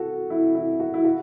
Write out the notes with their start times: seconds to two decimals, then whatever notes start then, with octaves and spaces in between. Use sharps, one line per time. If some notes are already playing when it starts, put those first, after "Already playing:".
Already playing: F#4 A4
0.30 E4
0.55 E4
0.80 F#4
0.94 E4
1.04 F#4